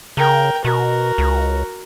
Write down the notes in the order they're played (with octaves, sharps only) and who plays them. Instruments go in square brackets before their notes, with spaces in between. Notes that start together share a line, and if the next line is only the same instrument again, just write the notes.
[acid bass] C#3 [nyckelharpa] A#4 G5
[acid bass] B2 [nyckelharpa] F#4 A#4
[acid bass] C#2